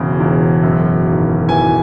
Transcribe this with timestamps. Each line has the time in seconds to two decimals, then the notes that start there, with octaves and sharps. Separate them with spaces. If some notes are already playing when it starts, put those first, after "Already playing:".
Already playing: E1 E2 C#3
0.20 E1
0.63 F#2
1.06 G#1
1.48 E3 G#5